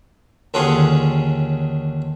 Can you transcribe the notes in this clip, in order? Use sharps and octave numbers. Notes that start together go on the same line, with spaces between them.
D#2 D3 C#4 F4 G#4 C#5